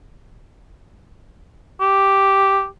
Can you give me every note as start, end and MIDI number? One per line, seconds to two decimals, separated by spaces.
1.80 2.66 67